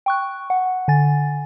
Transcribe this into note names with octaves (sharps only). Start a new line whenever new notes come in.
G5 C#6 F#6
F#5
D3 G#5 A6